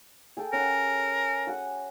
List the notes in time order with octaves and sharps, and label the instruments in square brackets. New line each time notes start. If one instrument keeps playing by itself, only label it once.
[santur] G#4 A4 G5
[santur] C#4 F#5 C6 [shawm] A#4
[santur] F#4 F#5 G#5